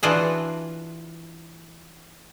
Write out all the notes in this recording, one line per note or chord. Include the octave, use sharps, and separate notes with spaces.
E3 D4 F4 F#4 G#4 F#5